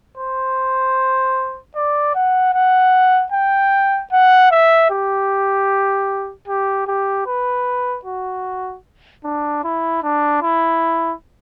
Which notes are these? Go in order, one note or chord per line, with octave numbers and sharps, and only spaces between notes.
C5
D5
F#5
F#5
G5
F#5
E5
G4
G4
G4
B4
F#4
D4
E4
D4
E4